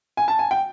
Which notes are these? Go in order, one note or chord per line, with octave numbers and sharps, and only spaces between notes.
G#5
A5
G#5
G5